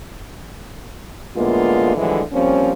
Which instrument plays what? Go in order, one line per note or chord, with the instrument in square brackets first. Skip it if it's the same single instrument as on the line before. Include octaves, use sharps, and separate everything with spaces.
[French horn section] A2 D3 G#3 A#3 B3 F4
A2 D3 E3 F3 G3 G#3
F3 G3 A#3 C4 C#4